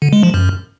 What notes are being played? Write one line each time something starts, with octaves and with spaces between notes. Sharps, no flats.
D3
G#3
F3
F#2